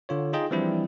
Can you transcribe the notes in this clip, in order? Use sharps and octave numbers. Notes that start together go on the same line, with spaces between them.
D3 F4 C#5
D#4 F4 G#4 D#5 G5
E3 F3 G3 C4 D4 E4